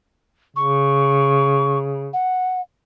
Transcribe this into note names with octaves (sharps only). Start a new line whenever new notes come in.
C#3 C#6
F#5